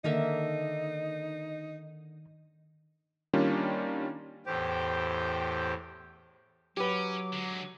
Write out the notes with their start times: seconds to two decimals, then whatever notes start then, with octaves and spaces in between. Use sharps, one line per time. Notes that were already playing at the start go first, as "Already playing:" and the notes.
0.04 D3 D#3 A#3 D#4 E5
3.33 D#3 G3 A#3 C#4 D4 F4
4.46 E2 A2 G4 C5 G5
6.77 F#3 C#4 G4 B4 D6
7.32 D3 G#3